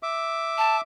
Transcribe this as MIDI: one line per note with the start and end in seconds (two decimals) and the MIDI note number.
0.03 0.81 76
0.03 0.81 86
0.58 0.76 81